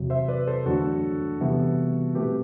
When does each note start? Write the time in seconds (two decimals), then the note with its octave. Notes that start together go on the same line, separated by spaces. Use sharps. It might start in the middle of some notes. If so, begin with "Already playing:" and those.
Already playing: E2 C3 F#3
0.10 C5 E5
0.28 B4 D5
0.47 A4 C5
0.66 E2 D3 F#3 A3 D4 F#4 A4
1.41 C3 E3 G3 B3 E4
2.15 B2 F#3 A3 C4 G4 B4